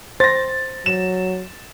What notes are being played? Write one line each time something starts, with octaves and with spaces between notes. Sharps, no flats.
C5 A6 A#6
F#3 E7